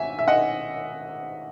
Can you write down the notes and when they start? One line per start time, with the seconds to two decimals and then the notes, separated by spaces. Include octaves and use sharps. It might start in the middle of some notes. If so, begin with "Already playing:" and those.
Already playing: G#1 E5 G#5
0.19 E5
0.28 D#5 F#5